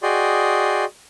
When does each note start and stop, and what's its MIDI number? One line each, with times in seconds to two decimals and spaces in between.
0.03 0.85 66
0.03 0.85 68
0.03 0.85 74
0.03 0.85 75
0.03 0.85 79
0.03 0.85 84